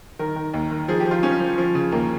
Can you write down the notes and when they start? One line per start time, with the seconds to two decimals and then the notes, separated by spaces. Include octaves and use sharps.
0.19 D#3 A#4
0.36 D#3
0.54 D#2
0.71 D#3
0.88 F3 G#4
1.00 G4
1.06 F3
1.11 F4
1.23 F3 C#4
1.40 F3
1.58 F3
1.75 C#3
1.92 D#2 A#3